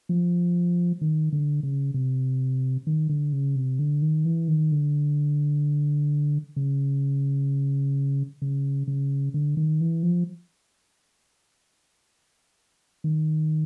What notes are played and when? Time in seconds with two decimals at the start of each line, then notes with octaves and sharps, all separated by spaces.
0.09 F3
1.01 D#3
1.32 D3
1.63 C#3
1.94 C3
2.87 D#3
3.09 D3
3.33 C#3
3.56 C3
3.79 D3
4.02 D#3
4.25 E3
4.48 D#3
4.72 D3
6.56 C#3
8.42 C#3
8.87 C#3
9.34 D3
9.57 D#3
9.81 E3
10.03 F3
13.04 D#3